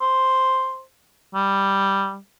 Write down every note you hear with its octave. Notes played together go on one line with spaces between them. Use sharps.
C5
G3